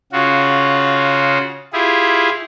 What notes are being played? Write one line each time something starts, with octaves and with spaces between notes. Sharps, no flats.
C#3 F4 F#4
E4 F4 G4 G#4